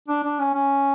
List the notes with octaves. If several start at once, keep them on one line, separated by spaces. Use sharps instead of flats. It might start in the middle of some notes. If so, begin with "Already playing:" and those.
D4
D4
C#4
C#4